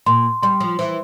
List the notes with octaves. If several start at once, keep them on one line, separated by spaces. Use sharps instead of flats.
A#2 C6
G3 C6
F3
E3 C5